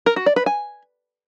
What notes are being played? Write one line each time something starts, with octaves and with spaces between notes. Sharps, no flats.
A#4
F#4
D5
B4
G#5